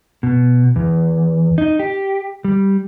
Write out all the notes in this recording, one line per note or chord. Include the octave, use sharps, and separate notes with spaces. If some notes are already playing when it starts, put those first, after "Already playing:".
B2
E2
D#4
G4
G3